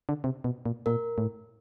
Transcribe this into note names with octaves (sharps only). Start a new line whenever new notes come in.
D3
C3
B2
A#2
A#2 A#4
A2